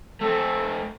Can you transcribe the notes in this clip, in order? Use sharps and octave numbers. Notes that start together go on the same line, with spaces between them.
A3 C4 A4